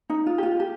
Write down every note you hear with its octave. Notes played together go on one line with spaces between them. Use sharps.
D#4
F4
G4
F4
G4